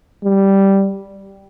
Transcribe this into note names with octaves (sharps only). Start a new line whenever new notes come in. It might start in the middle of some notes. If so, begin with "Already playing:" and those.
G3